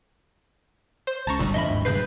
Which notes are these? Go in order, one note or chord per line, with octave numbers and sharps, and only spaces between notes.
C5
C#2 C#3 A5 A#5 C#6
G1 G2 A#2 D3 G3
F2 D#5 E5 B5
G#1 D#2 G#2
E1 G2 C#3 B4 G6 C7